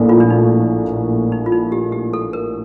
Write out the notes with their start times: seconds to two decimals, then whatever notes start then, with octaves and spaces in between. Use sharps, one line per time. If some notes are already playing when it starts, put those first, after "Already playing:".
Already playing: A#1 A2 A#3
0.09 F4
0.20 D4
0.30 D#4
1.32 D#4
1.46 F4
1.52 D#4
1.72 G4
1.92 G4
2.13 A4
2.33 A#4